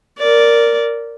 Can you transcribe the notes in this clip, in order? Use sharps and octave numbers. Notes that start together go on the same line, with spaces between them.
A#4 D5